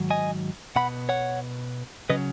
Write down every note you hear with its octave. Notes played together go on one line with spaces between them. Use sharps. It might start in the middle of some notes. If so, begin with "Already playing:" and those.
Already playing: G#2 D#3 F#3
D#5 G#5
B2 B3 F#5 B5
C#5 F#5
C#3 F#3 C#4 B4 D#5